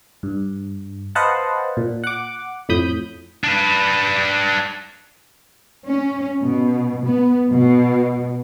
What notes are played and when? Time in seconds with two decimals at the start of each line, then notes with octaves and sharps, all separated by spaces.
0.23 G2
1.15 B4 C5 D#5 F5 F#5 A5
1.77 A#2
2.04 F#5 D6
2.69 F2 A2 B5 D#6 G6
3.44 D4 B4
5.86 C#4
6.43 B2
7.05 B3
7.52 B2